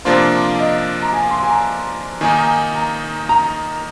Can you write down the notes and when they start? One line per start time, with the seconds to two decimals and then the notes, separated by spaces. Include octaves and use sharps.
0.05 C3 F3 A#3 D4 F4 C5
0.59 D#5
1.02 A#5
1.13 G#5
1.31 C6
1.43 G#5
1.49 A#5
2.21 D#3 A#3 D#4 G#5
2.32 A#5
2.44 G#5
2.75 A#5
3.29 A#5